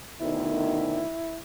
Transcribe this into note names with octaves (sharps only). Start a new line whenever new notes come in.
D2 B2 D#3 E4